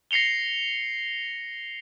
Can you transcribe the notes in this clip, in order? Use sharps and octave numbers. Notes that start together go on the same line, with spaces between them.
A#6 C7 C#7 F7 G7